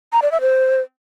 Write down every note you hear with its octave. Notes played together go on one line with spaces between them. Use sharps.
A#5
D5
E5
C5